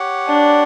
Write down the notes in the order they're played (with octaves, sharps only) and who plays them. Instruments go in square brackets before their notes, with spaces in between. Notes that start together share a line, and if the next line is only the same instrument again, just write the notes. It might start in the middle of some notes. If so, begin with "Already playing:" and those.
Already playing: [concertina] G4 C#5 F#5
[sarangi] D4